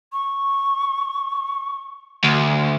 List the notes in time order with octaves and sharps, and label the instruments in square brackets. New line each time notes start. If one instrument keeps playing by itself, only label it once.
[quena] C#6
[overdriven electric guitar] D2